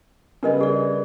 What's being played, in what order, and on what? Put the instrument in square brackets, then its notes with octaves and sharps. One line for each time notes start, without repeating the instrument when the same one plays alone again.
[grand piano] C#3 G3 B3 [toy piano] D4 A#4 D#5
[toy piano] G#4 D5